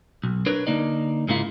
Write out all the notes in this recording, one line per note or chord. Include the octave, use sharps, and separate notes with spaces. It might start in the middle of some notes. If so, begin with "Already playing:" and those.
B1
D4 A#4 B4 C#5
D3 A#3 D#4 D5
G#2 C#3 G#3 A#3 E4 F4